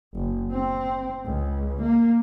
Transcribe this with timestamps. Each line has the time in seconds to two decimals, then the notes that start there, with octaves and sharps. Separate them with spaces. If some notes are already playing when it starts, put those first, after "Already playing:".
0.15 F#1
0.51 C4
1.25 C#2
1.83 A#3